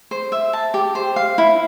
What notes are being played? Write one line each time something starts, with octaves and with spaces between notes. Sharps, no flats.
C5
E5
A5
G4
C5
F5
E4